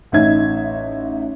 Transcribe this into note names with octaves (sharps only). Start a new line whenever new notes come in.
A1 D#4 E5 G#6